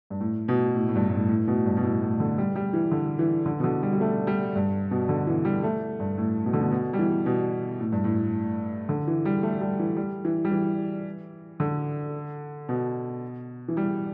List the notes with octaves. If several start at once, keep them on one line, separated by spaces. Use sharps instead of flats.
G2
A2
B2
A2
A2
G2
A2
G2
A2
A2
B2
G2
B2
A2
A2
D3
G3
G3
E3
D3
E3
D3
B2
D3
G3
G3
A3
G3
G2
B2
D3
E3
G3
A3
G2
A2
B2
D3
B2
B2
G3
E3
B2
A2
G2
A2
D3
E3
G3
A3
G3
E3
G3
E3
G3
E3
D3
B2
E3
G3